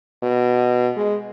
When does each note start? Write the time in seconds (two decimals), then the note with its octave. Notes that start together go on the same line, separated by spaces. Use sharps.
0.23 B2
0.97 G#3